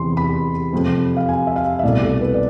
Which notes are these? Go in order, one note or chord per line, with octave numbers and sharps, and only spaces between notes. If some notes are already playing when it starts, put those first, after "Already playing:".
Already playing: E2 C3 E3 C6
B5
F2 C3 F3
F5
G#5
E5
F5
E5
C2 B2 A3 D5
A4
B4
D5